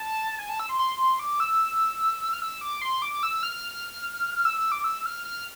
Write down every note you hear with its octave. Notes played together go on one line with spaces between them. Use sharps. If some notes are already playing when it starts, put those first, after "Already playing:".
Already playing: A5
G#5
A5
E6
C6
C6
D6
E6
F6
E6
D6
C6
D6
E6
F6
E6
E6
D6
E6
F6
F6